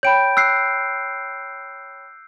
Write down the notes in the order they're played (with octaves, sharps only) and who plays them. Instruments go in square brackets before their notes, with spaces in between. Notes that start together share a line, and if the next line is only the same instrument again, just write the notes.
[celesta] C#5 G5 B5 [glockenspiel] G6 D7
[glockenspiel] E6 F#6 C7